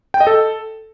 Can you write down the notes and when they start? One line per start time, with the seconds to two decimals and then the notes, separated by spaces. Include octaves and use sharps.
0.14 G5
0.20 D#5
0.27 A4